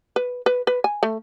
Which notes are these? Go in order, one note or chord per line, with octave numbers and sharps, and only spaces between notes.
B4
B4
B4
G#5
A3